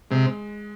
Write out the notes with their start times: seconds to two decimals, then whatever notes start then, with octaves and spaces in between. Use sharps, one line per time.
0.10 C3 G#3